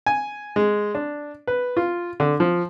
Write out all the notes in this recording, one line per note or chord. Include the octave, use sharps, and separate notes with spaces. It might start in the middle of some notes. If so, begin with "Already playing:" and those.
G#5
G#3
D4
B4
F4
D3
F3